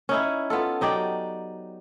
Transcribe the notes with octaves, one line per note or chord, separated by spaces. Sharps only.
C#4 D#4 E4
B3 F4 A4
F#3 D#4 G4 D5